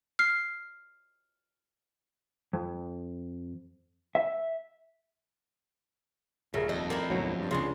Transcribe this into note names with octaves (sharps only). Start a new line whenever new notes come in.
F6 C7
F2
E5
D#1 C#3 A3 A#4
F2 D#5
A#3 D#4 E4 D5
D2 G#2 B2 F#3 C#5
G2
C#2 C#3 G3 G#3 D4 F4